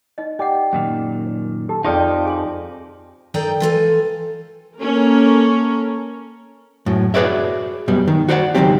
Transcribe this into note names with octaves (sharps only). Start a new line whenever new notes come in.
D#4 D#5
G4 D5 D#5 F#5
F#2 A#2 D#3
G4 A4
F2 F3 D#4 G4 G#4 D5 G5
G#4 G#5 C6
D#3 D#4 A4 D5 G5 A#5
E3 F4 A4 G#5
A#3 C#4 A4 A#4
F#2 A2
F#4 G#4 B4 C#5 D5 E5
F#2 B2 G3
D#3
F#4 C5 D5 E5 F#5
C#2 A#2 D#3 F#3 C4 G4